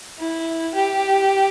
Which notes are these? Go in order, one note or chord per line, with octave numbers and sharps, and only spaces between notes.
E4
G4